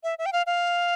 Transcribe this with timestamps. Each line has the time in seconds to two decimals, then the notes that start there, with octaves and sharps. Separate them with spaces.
0.04 E5
0.19 E5
0.26 G5
0.33 F5
0.46 F5